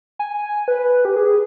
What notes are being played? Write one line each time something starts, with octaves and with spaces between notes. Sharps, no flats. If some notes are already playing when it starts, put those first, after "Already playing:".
G#5
B4
G4
G#4